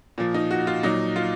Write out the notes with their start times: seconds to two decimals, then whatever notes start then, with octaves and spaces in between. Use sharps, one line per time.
0.18 A#2 F3
0.34 D#4
0.51 F#4
0.67 F4
0.83 A#2 F#3 D#4
1.16 F4